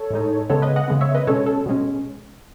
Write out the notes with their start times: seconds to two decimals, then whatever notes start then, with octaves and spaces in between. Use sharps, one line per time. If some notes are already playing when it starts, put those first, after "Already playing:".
Already playing: A4 C#5
0.10 A2 G#3 D#4
0.50 C#3 G#3 B3 A4 C#5
0.62 B4 D#5
0.76 D#5 F#5
0.88 C#3 G#3 B3
1.01 C#5 E5
1.15 B4 D#5
1.27 B2 G#3 C#4 A4 C#5
1.46 A4
1.66 B2 G#3 C#4